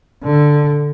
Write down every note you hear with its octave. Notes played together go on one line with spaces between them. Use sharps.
D3